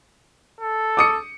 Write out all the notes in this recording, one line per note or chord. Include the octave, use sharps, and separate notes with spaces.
A4
D6 D#6 C#7